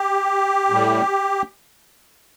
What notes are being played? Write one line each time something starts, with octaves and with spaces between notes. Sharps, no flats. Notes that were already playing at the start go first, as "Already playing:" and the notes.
Already playing: G4
A2 G3